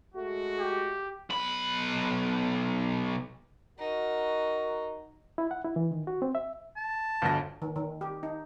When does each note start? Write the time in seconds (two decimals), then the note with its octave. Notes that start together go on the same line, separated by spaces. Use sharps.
0.15 G#3 A3 F#4
0.59 G4
1.30 B1 B5
3.79 D#4 F#4 A#4
5.38 E4
5.51 F#5
5.64 E4
5.76 E3
5.91 D#3
6.07 F#4
6.22 C4
6.35 E5
6.77 A5
7.22 G1 D2 A#6
7.62 D#3
7.76 D#3
8.01 G4
8.23 D#4